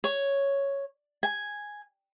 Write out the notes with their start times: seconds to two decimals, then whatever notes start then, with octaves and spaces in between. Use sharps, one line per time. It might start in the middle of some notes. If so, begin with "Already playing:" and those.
0.04 C#5
1.23 G#5